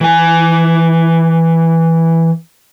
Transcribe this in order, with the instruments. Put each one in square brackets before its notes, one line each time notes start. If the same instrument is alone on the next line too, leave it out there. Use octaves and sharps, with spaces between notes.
[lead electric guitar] E3 G#5